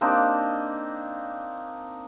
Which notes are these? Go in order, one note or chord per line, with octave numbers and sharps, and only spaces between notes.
A#3 C4 D4 D#4